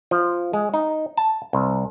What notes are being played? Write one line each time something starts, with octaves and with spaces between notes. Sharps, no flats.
F3
G#3
D#4
A5
C2